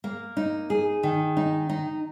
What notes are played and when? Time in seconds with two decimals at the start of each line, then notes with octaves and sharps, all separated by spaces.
0.04 A#3
0.37 D#4
0.70 G#4
1.03 D#3
1.37 D#4
1.69 D#4